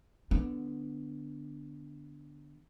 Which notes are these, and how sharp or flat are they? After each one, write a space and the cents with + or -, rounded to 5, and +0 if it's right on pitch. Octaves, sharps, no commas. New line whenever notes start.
D3 +0 B3 +0